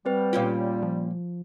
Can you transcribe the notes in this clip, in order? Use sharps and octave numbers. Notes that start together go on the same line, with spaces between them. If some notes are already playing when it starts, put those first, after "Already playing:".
G3 C4 B4 G5
A#2 C#4 F4 G4
F3